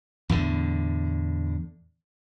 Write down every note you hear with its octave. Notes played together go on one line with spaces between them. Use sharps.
E2 A2 D3